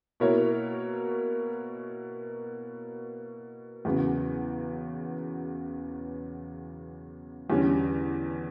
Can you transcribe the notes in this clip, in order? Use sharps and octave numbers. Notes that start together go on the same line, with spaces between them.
B2 A#3 E4 A#4 C#5
E2 C#3 F#3 B3
E2 D3 G3 C#4